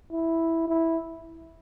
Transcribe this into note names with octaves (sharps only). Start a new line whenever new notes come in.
E4
E4